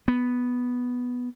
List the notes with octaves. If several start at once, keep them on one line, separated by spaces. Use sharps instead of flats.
B3